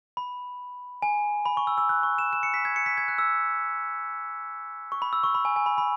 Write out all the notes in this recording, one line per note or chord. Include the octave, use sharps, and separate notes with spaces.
B5
G#5
B5
C#6
E6
E6
F#6
C#6
E7
E7
C#7
B6
G#6
C#7
B6
G#6
F#6
E6
C#6
B5
E6
C#6
B5
G#5
G#5
B5
B5